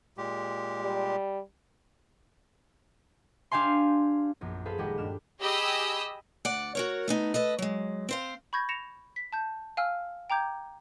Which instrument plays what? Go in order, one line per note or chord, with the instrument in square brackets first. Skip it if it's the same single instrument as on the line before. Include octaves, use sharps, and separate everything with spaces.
[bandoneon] A#2 G#3 G4
[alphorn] G3
[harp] D4 G4 F5 G#5 C6
A#1 F#2 B3
G#4 A4 B4 C5 F5 B5
D#1 G#3 G4 D#5 F#5
G2 D4 F6 E7
[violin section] G4 G#4 D#5 B5 D#6 E6
[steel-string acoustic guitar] D2 D5 F#5
F#4 A#4 C#5
A3 B3 D#4
A4 B4 D#5
F#3 G#3
C4 C5 F5
[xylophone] B5 C#6 G6 G#6 A#6
A#6 C#7 E7 F7
B6
A5 G6
F5 G#5 E6 F6
G5 A#5 D6 G6 G#6